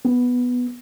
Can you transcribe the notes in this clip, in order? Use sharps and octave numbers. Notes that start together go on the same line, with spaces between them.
B3